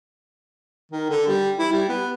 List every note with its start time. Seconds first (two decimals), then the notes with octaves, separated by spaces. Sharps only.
0.92 D#3
1.10 D3
1.28 G3
1.59 E4
1.72 G3
1.89 B3